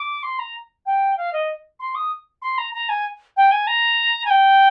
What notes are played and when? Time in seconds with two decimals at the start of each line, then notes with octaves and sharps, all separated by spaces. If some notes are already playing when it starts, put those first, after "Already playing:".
Already playing: D6
0.23 C6
0.39 A#5
0.86 G5
1.17 F5
1.33 D#5
1.80 C6
1.95 D#6
2.42 C6
2.58 A#5
2.74 A#5
2.89 G#5
3.37 G5
3.51 G#5
3.67 A#5
4.25 G#5
4.30 G5